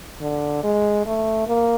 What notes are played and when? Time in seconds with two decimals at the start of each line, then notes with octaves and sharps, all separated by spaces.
0.21 D3
0.64 G#3
1.06 A3
1.48 A#3